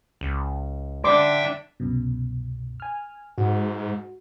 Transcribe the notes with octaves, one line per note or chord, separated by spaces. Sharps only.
C#2
D3 D4 D5 E5 G5 C6 D6
C2 F#2 B2
G#5 F6
G#2 F#4